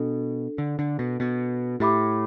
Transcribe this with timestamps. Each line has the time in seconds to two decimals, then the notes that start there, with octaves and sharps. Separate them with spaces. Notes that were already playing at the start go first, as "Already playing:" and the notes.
Already playing: B2 D4 A4
0.58 D3
0.79 D3
0.99 B2
1.20 B2
1.80 A2 G4 E5 B5 D6